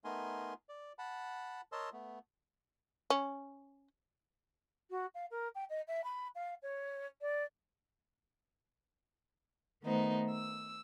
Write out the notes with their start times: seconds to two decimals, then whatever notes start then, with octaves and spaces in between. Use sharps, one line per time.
0.04 A3 B3 D#4 A#4 G#5 C6
0.69 D5
0.99 F#5 A5 B5
1.72 A#4 C#5 D#5 A5 C6 E6
1.93 A3 B3
3.10 C#4
4.90 F#4
5.14 F5
5.30 A#4
5.55 G5
5.69 D#5
5.87 E5
6.04 B5
6.35 F5
6.62 C#5
7.21 D5
9.83 D#3 A3 B3 D#4 C5
10.32 E6